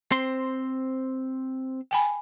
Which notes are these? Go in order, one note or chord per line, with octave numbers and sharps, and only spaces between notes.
C4 C5 C6
G5 G#5 B5